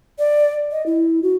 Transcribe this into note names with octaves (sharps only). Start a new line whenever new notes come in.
D5
D#5
E4
F#4